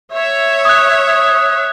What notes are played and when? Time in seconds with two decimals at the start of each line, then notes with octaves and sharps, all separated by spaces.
0.14 C#5 E5
0.65 D#6 F#6